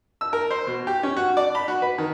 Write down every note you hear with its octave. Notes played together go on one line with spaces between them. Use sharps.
E6
A#4
C5
B2
G4
C#4
F#4
D5
B5
F#4
B4
D#3